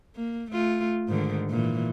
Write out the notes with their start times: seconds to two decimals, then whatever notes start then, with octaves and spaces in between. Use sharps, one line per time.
0.16 A#3
0.51 A3 F4
1.08 G#2 D3 D#3
1.50 A#2 E3